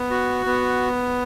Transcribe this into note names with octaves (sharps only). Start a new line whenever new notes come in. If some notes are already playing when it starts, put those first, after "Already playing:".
Already playing: B3
F#4
B3